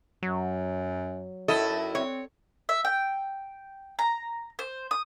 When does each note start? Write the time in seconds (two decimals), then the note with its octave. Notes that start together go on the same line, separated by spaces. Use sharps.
0.23 F#2 F#3
1.48 F#2 E4 A4 D#5
1.95 C4 C#5
2.69 E5
2.85 G5
3.99 A#5
4.59 C5
4.91 D#6